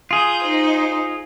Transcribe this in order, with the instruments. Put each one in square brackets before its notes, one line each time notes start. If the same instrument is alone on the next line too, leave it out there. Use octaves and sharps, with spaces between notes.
[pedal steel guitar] F4 G#4 [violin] D#6 G6
[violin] D#4 C5